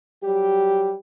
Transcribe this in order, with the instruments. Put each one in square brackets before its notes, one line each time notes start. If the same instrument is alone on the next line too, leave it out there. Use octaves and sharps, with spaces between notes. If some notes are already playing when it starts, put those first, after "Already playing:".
[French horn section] F#3 G3 G4